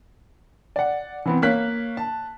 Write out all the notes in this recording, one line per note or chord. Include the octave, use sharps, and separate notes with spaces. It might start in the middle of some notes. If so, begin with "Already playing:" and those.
D5 F#5
E3 B3 C4
A#3 C#5 F#6 B6
A5